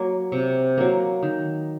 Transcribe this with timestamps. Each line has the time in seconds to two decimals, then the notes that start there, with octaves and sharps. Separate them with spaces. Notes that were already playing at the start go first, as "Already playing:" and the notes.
Already playing: F#3 A#3
0.32 C3
0.77 F#3 A#3
1.23 D#3